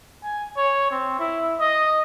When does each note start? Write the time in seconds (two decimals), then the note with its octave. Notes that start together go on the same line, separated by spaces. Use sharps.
0.24 G#5
0.57 C#5
0.91 C4
1.19 E4
1.60 D#5